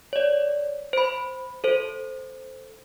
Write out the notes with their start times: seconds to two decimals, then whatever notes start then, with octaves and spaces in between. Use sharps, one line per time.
0.13 C#5 D5
0.93 C5 B5
1.64 A4 C5